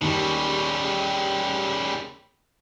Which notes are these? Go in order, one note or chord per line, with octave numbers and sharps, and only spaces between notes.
D#2 C#3 G3